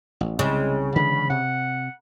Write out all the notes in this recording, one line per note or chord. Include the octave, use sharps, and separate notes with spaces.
A1
C2 C#3 G#3
D3 E3 G#3 B5
C3 F#5